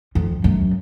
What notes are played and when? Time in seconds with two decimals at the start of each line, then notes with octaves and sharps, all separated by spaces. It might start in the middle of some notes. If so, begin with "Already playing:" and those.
0.15 F2
0.44 F#2